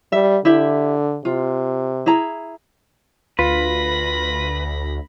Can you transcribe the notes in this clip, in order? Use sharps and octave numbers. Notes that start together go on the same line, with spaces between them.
G3 E5
D3 E4 G4 E5
C3 F4
E4 G#4 A#5
D2 F4 B4 B5 A#6